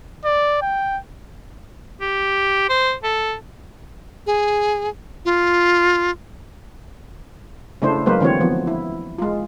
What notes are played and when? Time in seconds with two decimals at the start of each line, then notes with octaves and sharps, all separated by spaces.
0.25 D5
0.62 G5
2.01 G4
2.69 C5
3.03 A4
4.26 G#4
5.25 F4
7.82 C#3 A3 D4 E4 C5
8.06 F#3 G#3 A#3 B4 C5
8.20 D3 E3 C4 F#4 C#5
8.41 F3 B3
8.67 E4
9.18 G#3 F4